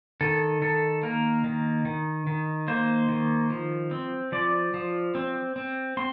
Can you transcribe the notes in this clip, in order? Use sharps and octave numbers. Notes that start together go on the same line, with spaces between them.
D#3 A4
D#3 A4
A#3 A#4
D#3
D#3
D#3
A#3 C5
D#3
F3
C4
F3 D5
F3
C4
C4
C4 C6